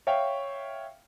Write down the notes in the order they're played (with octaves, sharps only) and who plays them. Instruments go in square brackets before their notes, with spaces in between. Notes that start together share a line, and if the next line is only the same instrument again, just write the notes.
[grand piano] C#5 E5 F5 G5